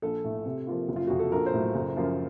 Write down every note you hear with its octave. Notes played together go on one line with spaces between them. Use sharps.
A#1 A4
A2 A3
C3
F3 A#3 F4
F#1
F4
F2 C3 F#3 F#4
A4
A#1 A#4
C5
A2 F#3
F#1
F#2 F3 A#3 F4